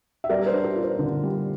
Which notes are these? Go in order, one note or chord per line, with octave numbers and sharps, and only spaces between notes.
E5
G3 A#4 D5
C5
D4
A#4
F4
C5
D3
G3